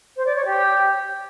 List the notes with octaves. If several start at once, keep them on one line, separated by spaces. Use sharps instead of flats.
C5
D5
C#5
G4